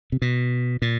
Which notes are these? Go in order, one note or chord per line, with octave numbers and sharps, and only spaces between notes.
C3
B2
A#2